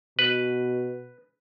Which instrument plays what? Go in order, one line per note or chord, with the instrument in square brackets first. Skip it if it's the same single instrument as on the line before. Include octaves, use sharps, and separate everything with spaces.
[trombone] B2 [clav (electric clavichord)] B4